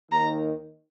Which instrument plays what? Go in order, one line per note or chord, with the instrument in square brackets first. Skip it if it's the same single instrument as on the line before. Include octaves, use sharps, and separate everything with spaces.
[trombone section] D#2 D#3 [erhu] A#5